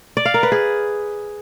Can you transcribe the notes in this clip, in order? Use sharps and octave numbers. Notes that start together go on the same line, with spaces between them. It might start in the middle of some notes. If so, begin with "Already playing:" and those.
D5
F5
A#4
B4
G#4